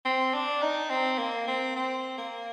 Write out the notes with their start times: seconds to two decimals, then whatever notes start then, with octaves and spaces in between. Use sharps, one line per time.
0.05 C4
0.34 D4
0.62 D#4
0.90 C4
1.18 A#3
1.48 C4
1.76 C4
2.18 A#3